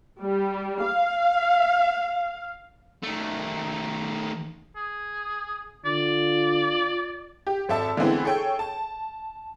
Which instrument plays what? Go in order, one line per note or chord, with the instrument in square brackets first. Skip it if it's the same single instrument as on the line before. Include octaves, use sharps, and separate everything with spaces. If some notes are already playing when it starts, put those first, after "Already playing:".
[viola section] G3
F5
[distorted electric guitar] D#3 A3
[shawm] G#4
[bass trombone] D3 [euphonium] F4 [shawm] D5
[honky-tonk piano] G4
G#1 A4 E5 A5
D3 E3 G#3 B3 C4 E4
G#4 A4 C#5 G5
A5